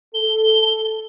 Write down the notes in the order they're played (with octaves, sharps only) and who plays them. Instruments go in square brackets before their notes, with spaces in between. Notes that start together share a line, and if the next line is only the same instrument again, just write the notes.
[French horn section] A4 [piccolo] G7